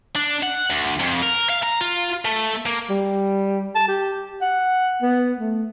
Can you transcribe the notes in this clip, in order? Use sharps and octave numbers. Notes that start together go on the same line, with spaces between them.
D4
F#5
D2
F2
A#4
F5
A#5
F4
A3
A#3
G3
A5
G4
F#5
B3
A3